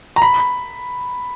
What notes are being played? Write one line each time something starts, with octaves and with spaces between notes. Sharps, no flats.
A#5
B5